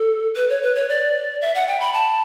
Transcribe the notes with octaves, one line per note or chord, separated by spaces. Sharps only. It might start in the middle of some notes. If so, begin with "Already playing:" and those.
Already playing: A4
B4
C#5
B4
C#5
D5
E5
F#5
G5
B5
A5